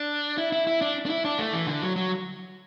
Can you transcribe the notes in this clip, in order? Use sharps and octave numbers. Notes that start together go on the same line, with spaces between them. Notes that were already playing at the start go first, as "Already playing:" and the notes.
Already playing: D4
E4
E4
E4
D4
D4
E4
D4
A3
E3
D3
F#3
F#3